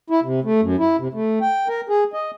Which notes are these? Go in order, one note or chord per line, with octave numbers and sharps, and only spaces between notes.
E4
C3
A3
F#2
E4
C3
A3
G5
A#4
G#4
D#5